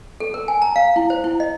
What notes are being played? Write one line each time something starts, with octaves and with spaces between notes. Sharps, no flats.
A4
A#4
G#5
A#5
F5
E4
C5
E4
D#5